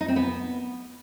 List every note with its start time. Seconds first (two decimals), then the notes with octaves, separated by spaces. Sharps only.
0.01 D#4
0.08 C4
0.16 B3